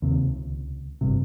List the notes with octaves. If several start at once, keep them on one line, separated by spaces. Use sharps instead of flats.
D#2 C3
C#2
G#1 G2 C3